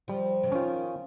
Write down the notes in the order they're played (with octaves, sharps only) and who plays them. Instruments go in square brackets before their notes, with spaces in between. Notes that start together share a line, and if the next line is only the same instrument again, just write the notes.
[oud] F3 [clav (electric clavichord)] G3
[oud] C#3
[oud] D#3 [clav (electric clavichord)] C#4 F4